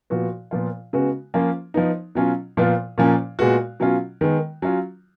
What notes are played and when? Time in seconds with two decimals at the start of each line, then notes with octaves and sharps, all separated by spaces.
0.10 A#2 F3 B3 F#4
0.51 A#2 F3 B3 F4
0.93 C#3 G#3 B3 F#4
1.34 F3 A#3 C#4 F4
1.74 F3 B3 D#4
2.15 B2 F#3 C#4 F4
2.57 A#2 F3 B3 F4
2.98 A#2 F3 A#3 C#4
3.39 A#2 G#3 B3 F#4
3.80 B2 F#3 C#4 F4
4.21 D#3 G#3 B3
4.62 F#3 C#4 F4